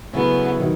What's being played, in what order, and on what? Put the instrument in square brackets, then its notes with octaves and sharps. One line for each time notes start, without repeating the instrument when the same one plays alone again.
[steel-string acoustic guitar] C#3 F#3 A3 C#4 E4 [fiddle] B3
[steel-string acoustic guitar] D#3 F#3